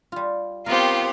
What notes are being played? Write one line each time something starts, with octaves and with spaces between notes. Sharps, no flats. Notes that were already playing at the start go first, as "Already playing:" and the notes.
G3 F4
B3 C4 F4 G4 A#4